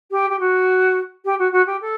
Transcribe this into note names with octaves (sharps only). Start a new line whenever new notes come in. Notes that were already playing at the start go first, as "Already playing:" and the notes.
G4
G4
F#4
G4
F#4
F#4
G4
A4